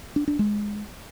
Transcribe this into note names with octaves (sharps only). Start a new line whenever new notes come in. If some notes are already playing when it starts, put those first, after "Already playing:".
D4
D4
G#3